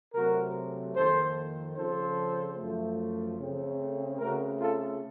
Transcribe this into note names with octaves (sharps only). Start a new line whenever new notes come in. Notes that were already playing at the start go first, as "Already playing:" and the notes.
C3 F#3 A3 C4 F#4 A#4
F2 D#3 A#3 A4 C5
C#3 F3 C4 A4 C5
F#2 F3 A3
C#3 A3 C4
C#3 A3 C4 F#4 A#4
F4 A4